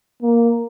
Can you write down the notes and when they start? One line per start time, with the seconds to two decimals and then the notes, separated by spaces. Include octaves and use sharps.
0.22 A#3